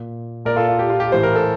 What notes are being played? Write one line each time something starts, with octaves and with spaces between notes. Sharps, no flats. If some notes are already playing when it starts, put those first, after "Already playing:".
Already playing: A#2
A#2 A#4 D5
F4 A4
F4
G4
F4
G4
A2 E3 C5
A#4
A4